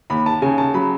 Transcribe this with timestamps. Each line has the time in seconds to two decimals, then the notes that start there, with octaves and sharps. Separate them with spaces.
0.10 D#2 B5
0.26 A5
0.42 C#3 G#5
0.58 A5
0.74 F#3 B5